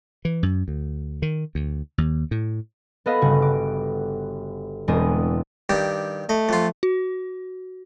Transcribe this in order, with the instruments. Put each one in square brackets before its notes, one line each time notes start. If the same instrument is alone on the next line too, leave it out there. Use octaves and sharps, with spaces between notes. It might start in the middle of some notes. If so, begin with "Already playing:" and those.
[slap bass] E3
F#2
D2
D#3
D2
D#2
A2
[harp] B3 A4 B4 D#5 F5
G1 C#3 F#4
D6
E1 E2 G#3 C4 D4 D#6
[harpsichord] G2 D#3 G4
[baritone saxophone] A3 [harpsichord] D#5
[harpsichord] F2 F4
[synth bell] F#4